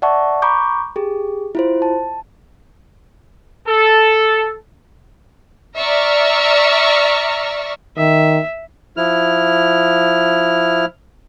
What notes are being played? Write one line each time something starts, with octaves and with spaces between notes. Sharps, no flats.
D5 E5 F#5 A5 C#6
A#5 B5 C#6 D6 G6
G4 G#4
E4 F4 C5
A5
A4
D5 E5 A#5 C#6 F6
D#3 E5
F3 E4 F6